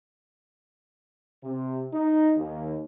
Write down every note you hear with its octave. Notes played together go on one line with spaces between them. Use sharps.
C3
D#4
D#2